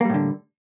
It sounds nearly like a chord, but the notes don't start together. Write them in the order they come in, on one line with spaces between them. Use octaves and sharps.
A#3 G3 A2 D3